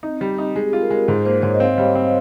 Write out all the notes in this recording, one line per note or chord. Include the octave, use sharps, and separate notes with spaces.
C4 D#4
G3
D#4 G4
G#3 G#4
F4
A#4
G#3
G#2 C5
A#3 C5
G#2 C#5
D#5
C4 F5
G3
C4